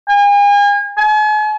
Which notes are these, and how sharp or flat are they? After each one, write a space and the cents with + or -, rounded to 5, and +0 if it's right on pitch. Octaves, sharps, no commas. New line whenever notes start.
G#5 -40
G#5 +40